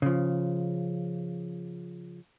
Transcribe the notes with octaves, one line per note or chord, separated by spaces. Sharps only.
C#3 F3